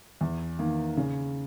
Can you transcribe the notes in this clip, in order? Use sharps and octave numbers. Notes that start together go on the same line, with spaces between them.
E2
D#3 A#3
C#3